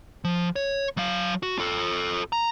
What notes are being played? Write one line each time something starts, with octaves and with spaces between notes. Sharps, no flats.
F3
C#5
F#3 F5
F#4
F4 A4
A#5